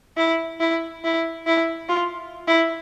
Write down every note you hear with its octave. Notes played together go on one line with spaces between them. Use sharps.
E4
E4
E4
E4
F4
E4